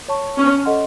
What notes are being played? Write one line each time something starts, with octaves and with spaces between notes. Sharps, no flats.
C#5 A5 C#6
C#4
A4 D#5 F#5 C6